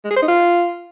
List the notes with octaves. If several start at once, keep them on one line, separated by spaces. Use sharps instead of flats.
G#3
G#4
C5
D#4
F4